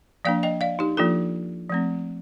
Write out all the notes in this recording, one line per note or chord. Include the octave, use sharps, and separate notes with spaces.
F3 A#3 D4 D5 F5
D#5 G5
D5 F5
D#4 G4
F3 A#3 D4 F4 A4
F3 A3 C4